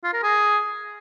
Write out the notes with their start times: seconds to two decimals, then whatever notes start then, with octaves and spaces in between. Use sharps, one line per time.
0.04 F4
0.14 A#4
0.23 G#4